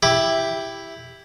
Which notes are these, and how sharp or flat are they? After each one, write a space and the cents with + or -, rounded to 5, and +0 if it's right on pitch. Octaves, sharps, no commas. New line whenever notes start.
E4 +0 G4 +5